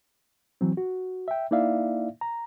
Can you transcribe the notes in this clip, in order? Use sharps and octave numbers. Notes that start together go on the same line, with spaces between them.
E3 F#3 C4
F#4
E5 G5
A#3 D#4 E4 D5 E5 F5
A#5